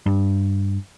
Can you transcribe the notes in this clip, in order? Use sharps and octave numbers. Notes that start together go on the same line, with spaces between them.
G2